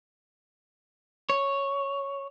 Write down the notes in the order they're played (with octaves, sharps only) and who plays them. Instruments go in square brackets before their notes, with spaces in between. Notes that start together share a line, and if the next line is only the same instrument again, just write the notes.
[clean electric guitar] C#5